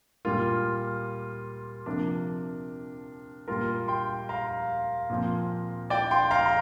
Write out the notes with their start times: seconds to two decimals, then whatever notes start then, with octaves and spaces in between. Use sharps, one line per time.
0.25 A#2 G3 A#3 F4
1.86 C3 F3 A#3 D4
3.48 A#2 G3 A#3 F4 A#4
3.88 G5 C6
4.29 F5 A#5
5.10 A#2 F3 C4
5.90 D5 G5
6.11 G5 C6
6.31 F5 A#5
6.46 A#5